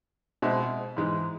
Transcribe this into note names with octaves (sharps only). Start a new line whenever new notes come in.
B2 G#3 C4 E4
G#2 E3 G#3